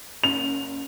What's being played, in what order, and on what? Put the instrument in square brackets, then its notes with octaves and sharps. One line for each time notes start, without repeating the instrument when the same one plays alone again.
[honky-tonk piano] F#1 [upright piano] F7